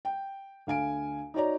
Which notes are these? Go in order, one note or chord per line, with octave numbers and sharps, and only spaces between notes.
G5
D2 F5 G#5 D7
D#4 F#4 C#5 D5 A#5